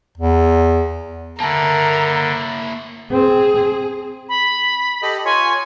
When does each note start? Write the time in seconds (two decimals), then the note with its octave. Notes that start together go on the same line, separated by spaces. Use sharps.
0.17 E2
1.40 D3 A#3 E4 A#4 G#5 A5
3.11 C4 G#4
4.29 B5
5.02 G4 A4 D#5
5.25 F4 C#5 G#5